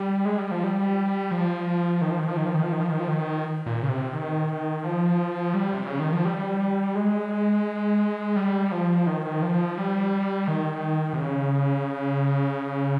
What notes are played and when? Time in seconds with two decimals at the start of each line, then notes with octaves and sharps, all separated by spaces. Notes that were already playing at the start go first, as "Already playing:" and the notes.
Already playing: G3
0.25 G#3
0.38 G3
0.51 F3
0.64 G3
1.31 F3
2.02 D#3
2.10 F3
2.19 D#3
2.28 F3
2.37 D#3
2.46 F3
2.55 D#3
2.63 F3
2.72 D#3
2.81 F3
2.91 D#3
3.00 F3
3.08 D#3
3.66 A#2
3.83 C#3
3.89 C3
4.13 D#3
4.84 F3
5.54 G3
5.74 C3
5.86 C#3
5.99 D#3
6.12 F3
6.25 G3
6.95 G#3
8.36 G3
8.72 F3
9.07 D#3
9.42 F3
9.78 G3
10.48 D#3
11.13 C3
11.19 C#3